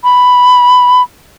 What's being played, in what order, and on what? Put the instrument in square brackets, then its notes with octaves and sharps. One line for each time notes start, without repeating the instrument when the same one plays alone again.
[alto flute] B5